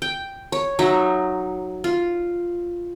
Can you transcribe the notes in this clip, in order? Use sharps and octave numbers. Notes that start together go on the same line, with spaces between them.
G5
C#5
F#3 D#4 E5
F4